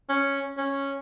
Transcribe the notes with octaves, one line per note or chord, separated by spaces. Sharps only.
C#4
C#4